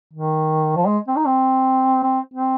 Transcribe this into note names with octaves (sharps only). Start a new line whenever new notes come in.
D#3
F3
G#3
C4
D#4
C4
C4
C4